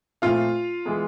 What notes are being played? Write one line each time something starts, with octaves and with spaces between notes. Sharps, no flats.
A#2 F3 A3 C4 F4 F5
E3 G#3 B3